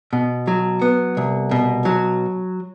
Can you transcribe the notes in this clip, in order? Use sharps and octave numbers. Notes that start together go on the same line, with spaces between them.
B2
F#3
B3
C2
B2
F#3